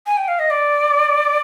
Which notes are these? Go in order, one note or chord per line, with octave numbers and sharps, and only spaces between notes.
G#5
G5
F5
D#5
D5